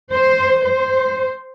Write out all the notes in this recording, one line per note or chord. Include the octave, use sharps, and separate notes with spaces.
C5
C5